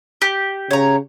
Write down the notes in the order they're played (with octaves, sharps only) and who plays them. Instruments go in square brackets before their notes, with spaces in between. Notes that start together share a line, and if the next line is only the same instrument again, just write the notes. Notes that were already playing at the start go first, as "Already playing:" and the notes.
[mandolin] G4
[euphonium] C#3 [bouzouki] C#5 A#5